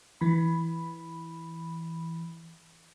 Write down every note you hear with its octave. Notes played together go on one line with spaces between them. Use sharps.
E3 B5